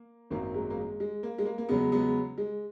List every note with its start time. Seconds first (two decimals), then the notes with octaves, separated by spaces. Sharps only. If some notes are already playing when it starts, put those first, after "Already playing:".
Already playing: A#3
0.30 G#1 F#2 D#3 F#3 A#3
0.54 G#3
0.70 A#3
0.77 G#3
1.00 G#3
1.23 A#3
1.38 G#3
1.45 A#3
1.58 A#3
1.69 E2 C#3 F#3 G#3 B3
1.92 G#3 B3
2.38 G#3